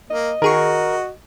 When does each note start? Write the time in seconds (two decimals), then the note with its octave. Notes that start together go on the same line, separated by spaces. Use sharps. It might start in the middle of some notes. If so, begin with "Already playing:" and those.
0.11 A#3 D#5
0.42 D#3 F#4 G#4 A#4 C#6